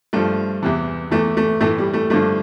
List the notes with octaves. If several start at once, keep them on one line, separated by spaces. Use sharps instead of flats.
G2 F3 A3
E2 C3 E3
E2 E3 A3
A3
A2 E3 A3
G3
A3
G2 D3 F3 A3